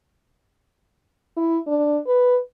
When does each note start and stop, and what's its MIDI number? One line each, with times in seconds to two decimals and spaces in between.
1.37 1.57 64
1.67 1.98 62
2.06 2.37 71